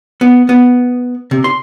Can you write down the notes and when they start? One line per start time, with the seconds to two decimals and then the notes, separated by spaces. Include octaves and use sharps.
0.21 B3
0.49 B3
1.31 C3
1.44 C6